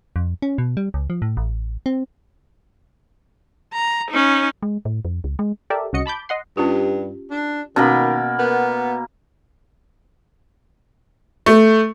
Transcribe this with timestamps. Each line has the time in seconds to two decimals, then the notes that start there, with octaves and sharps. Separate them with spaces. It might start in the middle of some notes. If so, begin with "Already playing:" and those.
0.16 F2
0.42 C#4
0.58 B2
0.77 G3
0.94 C#2
1.10 F3
1.22 A2
1.37 A1
1.86 C4
3.73 A#5
4.10 C#4 D#4
4.63 G#3
4.85 A2
5.05 F2
5.24 C#2
5.39 G#3
5.70 G4 A4 A#4 D5 E5
5.93 C2 C#3 F#4 D#5 C#7
6.06 A5 B5 D6 G6
6.29 D#5 F#5 C6
6.57 G2 C#4 F4 G4
7.31 D4
7.76 B2 D#3 A#3 C#4 B5
8.39 B3 A#4
11.46 A3